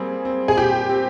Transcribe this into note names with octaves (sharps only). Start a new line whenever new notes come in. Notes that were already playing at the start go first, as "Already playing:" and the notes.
Already playing: G3 A#3 C4 G#4
C4
G#4
A#2 G4
C4